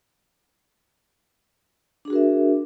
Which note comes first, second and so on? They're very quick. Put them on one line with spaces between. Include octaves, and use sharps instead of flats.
D4 G#4 F#4 A#4 E5